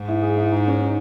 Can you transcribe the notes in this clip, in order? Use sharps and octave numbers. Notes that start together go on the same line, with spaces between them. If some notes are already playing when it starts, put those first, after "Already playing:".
Already playing: G#2
E4
G#4
E4
D#4
C#4
D#4